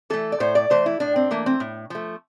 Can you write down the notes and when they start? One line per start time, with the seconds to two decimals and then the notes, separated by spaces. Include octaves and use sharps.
0.10 E3 A3 A4
0.32 D5
0.40 A2 C5
0.55 D5
0.70 E3 A3 C5
0.86 E4
1.00 A2 D4
1.16 C4
1.31 E3 A3 A#3
1.46 C4
1.60 A2
1.90 F3 A3